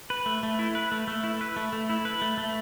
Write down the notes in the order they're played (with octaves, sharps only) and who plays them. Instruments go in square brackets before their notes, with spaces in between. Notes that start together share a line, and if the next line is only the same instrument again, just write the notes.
[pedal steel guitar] B4
A3
A3
E4
B4
A3
A3
E4
B4
A3
A3
E4
B4
A3
A3